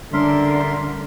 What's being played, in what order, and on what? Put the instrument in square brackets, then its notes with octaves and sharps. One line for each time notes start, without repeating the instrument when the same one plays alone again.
[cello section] D3 [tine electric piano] G3 C#4 D4 [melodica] A#4 E5 C6